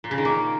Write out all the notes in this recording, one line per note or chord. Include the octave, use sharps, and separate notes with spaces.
A#2
C#3
D#3
A#3